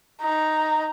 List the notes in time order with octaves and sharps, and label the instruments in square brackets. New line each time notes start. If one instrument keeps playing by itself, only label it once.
[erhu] D#4